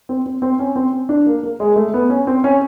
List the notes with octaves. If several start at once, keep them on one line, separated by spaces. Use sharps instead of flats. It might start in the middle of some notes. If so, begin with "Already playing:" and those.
C4
C4
C4
C#4
C4
D4
A#3
A#3
G#3
A3
B3
C#4
C4
C#4